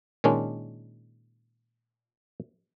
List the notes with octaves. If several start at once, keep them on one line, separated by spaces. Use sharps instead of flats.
A#2 D#3 G#3 C#4 D4